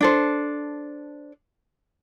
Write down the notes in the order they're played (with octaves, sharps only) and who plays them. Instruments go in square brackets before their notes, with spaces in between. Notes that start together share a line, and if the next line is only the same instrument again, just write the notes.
[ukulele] D4 A4 C5